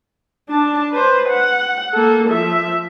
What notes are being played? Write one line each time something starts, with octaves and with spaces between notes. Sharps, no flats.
D4 A5
B4 C5
F#5
A#3 A4
F3 E5